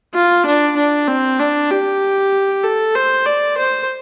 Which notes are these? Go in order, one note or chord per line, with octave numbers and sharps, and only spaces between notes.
F4
D4
D4
C4
D4
G4
A4
C5
D5
C5